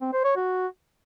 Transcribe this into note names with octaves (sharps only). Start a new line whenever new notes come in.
C4
C5
C#5
F#4